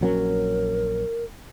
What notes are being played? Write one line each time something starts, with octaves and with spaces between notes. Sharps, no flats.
A#1 F#3 C#4 A#4